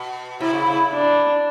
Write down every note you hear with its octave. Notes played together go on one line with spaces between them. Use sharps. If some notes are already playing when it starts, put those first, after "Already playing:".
Already playing: B2
C3 E4
C#3
C#3
D4